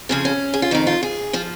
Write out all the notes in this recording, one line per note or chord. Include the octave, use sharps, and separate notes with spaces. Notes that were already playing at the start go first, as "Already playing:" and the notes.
F2 C#3 F3 G#4
C#4
G#4
F4
F2 D#3 D#4
F4
G#4
F3 F4